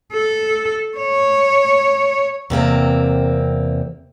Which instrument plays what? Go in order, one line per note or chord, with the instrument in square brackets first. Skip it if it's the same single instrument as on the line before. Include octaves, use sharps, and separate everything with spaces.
[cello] A4
C#5
[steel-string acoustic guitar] E2 C3 A#3 C4